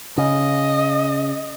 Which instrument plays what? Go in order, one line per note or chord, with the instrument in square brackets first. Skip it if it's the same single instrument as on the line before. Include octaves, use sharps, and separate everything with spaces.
[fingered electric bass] C#3 [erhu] D#5